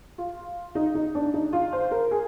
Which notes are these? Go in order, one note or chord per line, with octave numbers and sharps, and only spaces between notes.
F4
D#4
D#4
D4
D#4
F4
C5
A#4
G#4